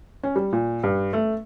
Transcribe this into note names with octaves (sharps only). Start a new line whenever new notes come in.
C#4
G3
A#2
G2
A3